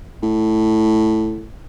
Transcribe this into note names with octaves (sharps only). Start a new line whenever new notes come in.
A2